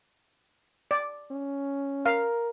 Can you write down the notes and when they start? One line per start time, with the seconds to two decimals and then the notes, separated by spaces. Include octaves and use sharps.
0.91 D5
1.31 C#4
2.06 A#4 F5